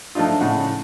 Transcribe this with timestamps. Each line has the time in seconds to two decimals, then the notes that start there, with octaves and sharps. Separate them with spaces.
0.15 F3 A3 D4 D#4 F4
0.40 A2 C#3 F#5